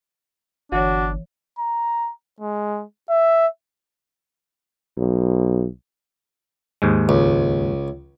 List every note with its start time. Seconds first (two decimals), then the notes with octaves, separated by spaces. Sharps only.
0.72 G1 E3 D4 F#4 C#5
1.59 A#5
2.40 G#3
3.10 E5
4.98 B1
6.82 D#2 G#2 G#3
7.09 C#2